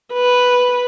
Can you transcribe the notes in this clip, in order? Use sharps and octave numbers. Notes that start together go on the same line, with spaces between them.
B4